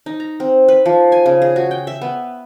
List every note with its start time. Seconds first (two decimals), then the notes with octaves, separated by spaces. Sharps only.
0.06 D#4
0.20 A#5
0.40 C4
0.68 B4
0.86 F3
1.12 G#5
1.26 C#3
1.42 G#4
1.56 F#4
1.71 G5
1.87 E5
2.02 B3